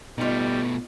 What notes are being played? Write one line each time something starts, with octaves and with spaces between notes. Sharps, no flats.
B2 G3 A3 B3 D#4 F4